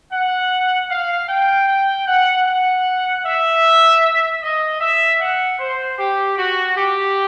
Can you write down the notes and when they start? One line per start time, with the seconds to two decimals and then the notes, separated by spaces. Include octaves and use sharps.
0.12 F#5
0.90 F5
1.29 G5
1.68 G5
2.07 F#5
2.46 F#5
3.25 E5
4.42 D#5
4.80 E5
5.20 F#5
5.59 C5
5.98 G4
6.37 F#4
6.76 G4